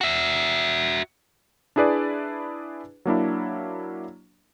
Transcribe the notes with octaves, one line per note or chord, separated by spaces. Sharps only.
F#4 E5
D4 E4 G#4 B4 D5
F#3 A#3 D4 E4